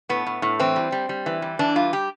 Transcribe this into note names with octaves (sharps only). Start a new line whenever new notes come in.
A2 B3
A2
A2
E3 C4
G3
G3
G3
E3
G3
E3 D4
G3 F4
G4